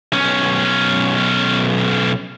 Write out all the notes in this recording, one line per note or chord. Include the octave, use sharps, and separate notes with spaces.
B1 C#4